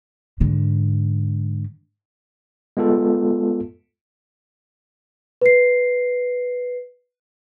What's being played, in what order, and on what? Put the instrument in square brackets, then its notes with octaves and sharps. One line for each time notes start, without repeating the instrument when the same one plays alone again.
[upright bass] G#2 D3
[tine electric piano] G#3 B3 F4 A4
[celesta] B4 C7